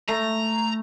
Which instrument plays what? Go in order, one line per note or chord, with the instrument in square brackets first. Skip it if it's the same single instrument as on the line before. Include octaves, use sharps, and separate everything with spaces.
[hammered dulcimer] A3 [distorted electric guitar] A#5